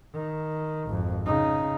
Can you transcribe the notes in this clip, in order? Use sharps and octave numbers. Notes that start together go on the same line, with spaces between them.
D#3
G#1 F2
C#3 D#4